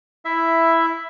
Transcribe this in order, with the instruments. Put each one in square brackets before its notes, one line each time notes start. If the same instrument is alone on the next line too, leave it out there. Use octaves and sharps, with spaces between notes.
[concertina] E4 E5